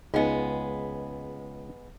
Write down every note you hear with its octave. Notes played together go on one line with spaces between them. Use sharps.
C#2 G#3 B3 D#4 D#5